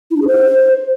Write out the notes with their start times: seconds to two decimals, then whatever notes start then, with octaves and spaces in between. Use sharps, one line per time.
0.11 E4
0.16 D4
0.22 G#4
0.27 C5